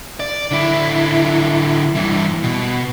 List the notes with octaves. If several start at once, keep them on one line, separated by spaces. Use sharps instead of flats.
D5
D3 E4
G2 E3
B2